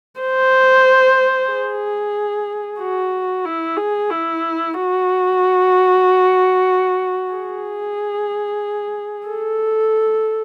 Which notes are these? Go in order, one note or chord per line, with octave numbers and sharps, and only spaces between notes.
C5
G#4
F#4
E4
G#4
E4
F#4
G#4
A4